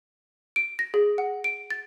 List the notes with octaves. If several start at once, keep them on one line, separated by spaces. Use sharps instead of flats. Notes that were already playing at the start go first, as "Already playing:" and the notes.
D7
A#6
G#4
F#5
D7
A6